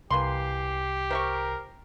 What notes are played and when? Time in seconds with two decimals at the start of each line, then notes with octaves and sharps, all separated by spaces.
0.10 C2 E3 A#3 G4 C6 C7
1.11 A#4 C5 E5 C#6